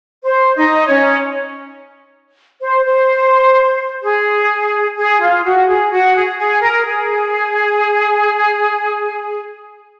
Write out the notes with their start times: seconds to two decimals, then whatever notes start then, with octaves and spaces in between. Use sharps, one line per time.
0.24 C5
0.56 D#4 D#5
0.88 C#4 C#5
2.61 C5
2.84 C5
4.03 G#4
4.97 G#4
5.20 F4
5.44 F#4
5.67 G#4
5.92 F#4
6.14 G#4
6.38 G#4
6.62 A#4
6.86 G#4